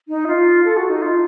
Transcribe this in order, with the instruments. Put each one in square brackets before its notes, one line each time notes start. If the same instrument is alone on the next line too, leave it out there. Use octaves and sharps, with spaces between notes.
[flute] D#4
F4
A4
F#4
D#4
F4